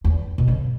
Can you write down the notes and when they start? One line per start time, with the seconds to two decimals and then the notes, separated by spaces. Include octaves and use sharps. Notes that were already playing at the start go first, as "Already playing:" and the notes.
0.04 E2
0.38 B2
0.48 C#3